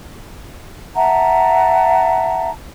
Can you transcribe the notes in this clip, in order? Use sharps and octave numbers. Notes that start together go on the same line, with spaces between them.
E5 F#5 A5 A#5